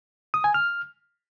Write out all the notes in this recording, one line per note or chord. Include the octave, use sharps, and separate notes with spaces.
D#6
G#5
F6